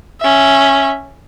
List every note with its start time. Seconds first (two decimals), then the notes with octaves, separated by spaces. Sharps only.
0.21 C#4 E5